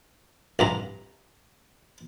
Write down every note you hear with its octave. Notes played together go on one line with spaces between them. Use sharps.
C2 G2 A#5